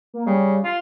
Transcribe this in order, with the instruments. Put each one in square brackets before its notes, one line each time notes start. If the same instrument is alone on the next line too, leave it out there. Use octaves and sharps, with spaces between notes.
[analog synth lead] A#3
[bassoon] C#3 [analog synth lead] G3
[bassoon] F4 [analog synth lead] C6